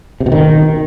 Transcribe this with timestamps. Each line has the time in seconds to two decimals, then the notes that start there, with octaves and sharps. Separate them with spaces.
0.20 C3
0.26 B2
0.32 D#3